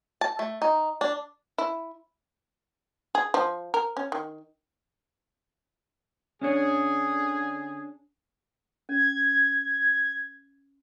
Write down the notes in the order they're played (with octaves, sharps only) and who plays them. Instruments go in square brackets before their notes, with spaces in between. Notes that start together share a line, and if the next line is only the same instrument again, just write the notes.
[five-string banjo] A5
A3
D#4
D4
[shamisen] E4
G#4
F3
A#4
C#4
D#3
[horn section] D3 G#4 [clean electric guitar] C#4 D4 C#5
[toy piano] C#4 [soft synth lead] G#6